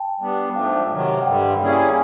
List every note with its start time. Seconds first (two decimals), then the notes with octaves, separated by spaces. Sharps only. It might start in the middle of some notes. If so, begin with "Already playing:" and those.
Already playing: G5 A5
0.20 G3 B3 D4
0.55 G#2 F3 A3 D4 F5 G5
0.92 C3 D#3 F#3
1.22 F#5
1.26 G2 D3 G3 F5 G5
1.61 G3 A#3 C#4 E4 G#4